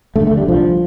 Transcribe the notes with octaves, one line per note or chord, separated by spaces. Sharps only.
D3 A3
A3
D3
G3
C2 F3